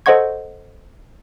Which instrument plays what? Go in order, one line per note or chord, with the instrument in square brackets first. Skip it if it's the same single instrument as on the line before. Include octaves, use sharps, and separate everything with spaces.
[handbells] A4 C5 D#5 F#5 C#6 G#6